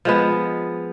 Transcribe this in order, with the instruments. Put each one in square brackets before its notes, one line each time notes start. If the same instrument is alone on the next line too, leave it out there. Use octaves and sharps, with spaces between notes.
[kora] F3 G#3 B3